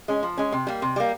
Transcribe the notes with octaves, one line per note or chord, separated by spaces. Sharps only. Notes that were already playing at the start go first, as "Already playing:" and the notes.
G#3 C#4
F3
G#3 C#4
C3
G3 A#3
C3
G3 A#3